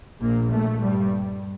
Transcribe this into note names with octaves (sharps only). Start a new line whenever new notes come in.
A#1 A#2 A#3
A3
G2 G3